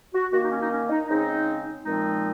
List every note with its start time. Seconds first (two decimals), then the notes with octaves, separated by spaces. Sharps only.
0.13 F#4
0.32 D#3 A#3 F#4
0.42 D#4
0.51 C#4
0.60 D#4
0.69 C#4
0.89 D#4
1.08 C#3 G#3 C4 D#4
1.83 A#2 F3 G#3 C4 D#4